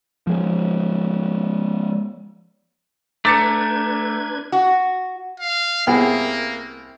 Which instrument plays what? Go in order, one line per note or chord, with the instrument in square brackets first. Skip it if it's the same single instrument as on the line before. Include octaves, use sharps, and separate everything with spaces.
[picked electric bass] F3 G#3
[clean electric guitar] A3 [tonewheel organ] D4 B4 G#6 [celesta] A#5 [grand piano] D6 A6 C#7
[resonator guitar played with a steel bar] F#4
[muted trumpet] F5
[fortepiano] C2 B3 G#4 [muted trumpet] A#3